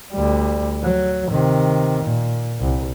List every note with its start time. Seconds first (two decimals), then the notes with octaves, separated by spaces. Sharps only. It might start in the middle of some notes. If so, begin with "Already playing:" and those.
0.13 D2 G3
0.83 F#3
1.31 C3 D#3
2.03 A#2
2.60 C2